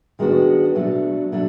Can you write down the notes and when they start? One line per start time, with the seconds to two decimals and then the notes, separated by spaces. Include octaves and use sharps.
0.19 D#3 G#3 B3 D4 F#4
0.75 B2 F#3 A3 D4
1.32 B2 F#3 A3 D4